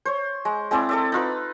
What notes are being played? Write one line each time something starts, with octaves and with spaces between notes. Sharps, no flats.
C5 C#5
G#3
G#3 C4 E4 D5
A4 D5 E5
D#4 F4 B4